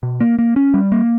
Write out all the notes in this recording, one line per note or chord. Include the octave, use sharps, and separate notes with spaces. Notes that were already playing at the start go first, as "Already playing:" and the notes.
B2
A#3
A#3
C#4
G3
A#3